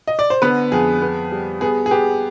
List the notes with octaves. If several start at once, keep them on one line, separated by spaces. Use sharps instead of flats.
D#5
D5
C5
D3 B3 B4
F2 G#4
B3
G3
B3 G#4
G#4
B3 G4